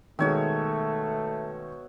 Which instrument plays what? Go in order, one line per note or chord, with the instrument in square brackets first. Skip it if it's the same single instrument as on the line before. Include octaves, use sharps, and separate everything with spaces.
[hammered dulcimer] B2 C#5 E5 [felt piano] D#3 G#3 [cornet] A3